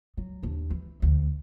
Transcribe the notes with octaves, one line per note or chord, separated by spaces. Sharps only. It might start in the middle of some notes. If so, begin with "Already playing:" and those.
F#3
D#2 D4
E3
D2